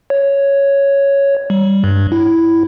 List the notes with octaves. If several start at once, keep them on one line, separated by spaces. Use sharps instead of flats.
C#5
G3
G2
E4